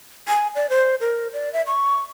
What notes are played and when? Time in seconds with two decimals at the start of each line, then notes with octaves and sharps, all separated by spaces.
0.28 G#5
0.55 D5
0.70 C5
1.01 A#4
1.33 D5
1.53 E5
1.67 C#6